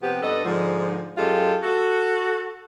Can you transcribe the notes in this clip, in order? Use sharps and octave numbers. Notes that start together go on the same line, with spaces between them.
C3 F3 B3 G4
G2 B3 A4 B4 D#5
G#2 D3 F3
F#2 G#3 F4 G4 A4
F#4 A4